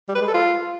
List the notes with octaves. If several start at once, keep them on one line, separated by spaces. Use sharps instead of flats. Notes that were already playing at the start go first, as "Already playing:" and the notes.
G3
B4
G#3
A4
F4